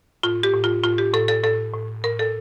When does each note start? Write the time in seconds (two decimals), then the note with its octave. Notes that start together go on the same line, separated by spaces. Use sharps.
0.23 A2 F4
0.43 G4
0.54 A2
0.64 F4
0.83 A2 F4
0.98 G4
1.13 A2 A4
1.28 A4
1.43 A2 A4
1.74 A2
2.04 A2 A#4
2.19 A4